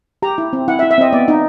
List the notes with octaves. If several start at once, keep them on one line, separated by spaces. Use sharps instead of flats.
G4 A#5
E4
C4
E4 F#5
E5
E4
E5
C4 D#5
B3 D5
D#4